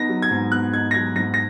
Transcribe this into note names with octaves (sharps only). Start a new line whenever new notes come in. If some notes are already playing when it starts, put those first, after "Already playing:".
Already playing: B3 D#4 A#6
F#3
G#6
G#2
B3 F#6
D#4 G#6
A#6
F#3 G#6
G#2 A#6
A#6